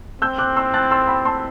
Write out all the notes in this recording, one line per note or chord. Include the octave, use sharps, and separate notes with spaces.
C4 E6 G6
D6 F#6
C6 E6
F#6 A6
C6 E6
G5 B5
A5 C6